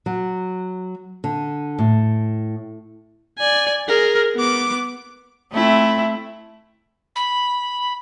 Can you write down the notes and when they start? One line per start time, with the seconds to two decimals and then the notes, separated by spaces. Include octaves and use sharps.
0.06 F#3
1.24 D3
1.79 A2
3.39 D5 G#5
3.88 G#4 A#4
4.36 B3 D6
5.52 A3 C4 E4
7.15 B5